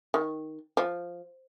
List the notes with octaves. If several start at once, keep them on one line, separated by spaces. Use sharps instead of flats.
D#3
F3